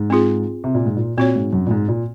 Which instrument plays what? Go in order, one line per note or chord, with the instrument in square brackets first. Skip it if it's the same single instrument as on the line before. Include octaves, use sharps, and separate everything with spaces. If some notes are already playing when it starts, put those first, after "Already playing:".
Already playing: [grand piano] G#2
[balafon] C4 F4 G#4
[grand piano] C3
A#2
G#2
A#2
[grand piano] A#2 [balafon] C4 F#4 C#5
[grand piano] G#2
F#2
A#2
G#2
A#2